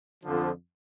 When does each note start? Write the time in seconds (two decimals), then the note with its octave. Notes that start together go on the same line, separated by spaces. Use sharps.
0.23 F2 D3 F3